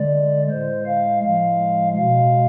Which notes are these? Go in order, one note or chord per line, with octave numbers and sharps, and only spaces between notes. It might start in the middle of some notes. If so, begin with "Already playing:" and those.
Already playing: D3 G#3 D5
A2 G#3 C5
F5
A2 F3 G#3 F5
B2 G#3 F5